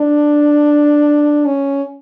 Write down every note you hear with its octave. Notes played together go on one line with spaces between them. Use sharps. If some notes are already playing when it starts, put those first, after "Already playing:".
Already playing: D4
C#4